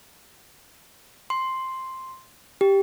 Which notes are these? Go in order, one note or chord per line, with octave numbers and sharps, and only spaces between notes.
C6
G4